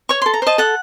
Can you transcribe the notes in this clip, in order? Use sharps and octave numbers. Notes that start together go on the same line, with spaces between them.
C#5 C#6
A4 C6
A#5
C5 D#5 A5
A4 F#5